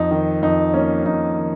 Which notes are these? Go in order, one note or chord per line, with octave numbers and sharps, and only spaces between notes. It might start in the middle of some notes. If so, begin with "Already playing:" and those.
Already playing: F2 D#4
D#3
F2 D#4
A#3 C#4
F2 D#4
D#3